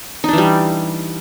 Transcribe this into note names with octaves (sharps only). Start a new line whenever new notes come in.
E3 G3 D4 D#4